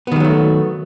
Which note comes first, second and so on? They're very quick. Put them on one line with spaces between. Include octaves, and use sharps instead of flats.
B3 D#3 G3 F#3 A3